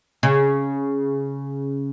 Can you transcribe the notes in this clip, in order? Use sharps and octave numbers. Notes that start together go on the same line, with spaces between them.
C#3